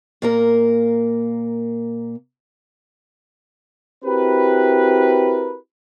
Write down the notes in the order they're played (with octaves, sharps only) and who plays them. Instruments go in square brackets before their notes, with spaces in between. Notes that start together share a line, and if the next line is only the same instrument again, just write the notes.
[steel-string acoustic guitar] A#2 A#3 A#4
[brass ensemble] C4 E4 F#4 G4 A#4 B4